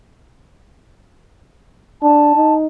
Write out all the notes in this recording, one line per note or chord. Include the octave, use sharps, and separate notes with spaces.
D4 A5
D#4